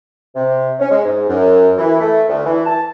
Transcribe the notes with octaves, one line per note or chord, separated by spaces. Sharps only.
C3
C#4
G#3
G#2
F#2
E3
A3
D2
E3
A5